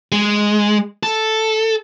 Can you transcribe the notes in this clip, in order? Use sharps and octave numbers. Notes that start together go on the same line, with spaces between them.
G#3
A4